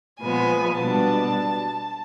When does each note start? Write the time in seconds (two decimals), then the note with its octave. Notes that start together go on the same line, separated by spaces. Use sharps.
0.20 A#2 F3 G#3 B3 G#5
0.78 B2 G3 B3 D4 A5